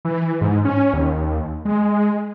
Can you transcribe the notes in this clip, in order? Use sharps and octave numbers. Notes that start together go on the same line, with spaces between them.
E3
G#2
C#4
D#2
G#3